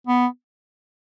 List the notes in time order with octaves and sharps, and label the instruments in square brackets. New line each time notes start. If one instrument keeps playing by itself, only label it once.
[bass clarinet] B3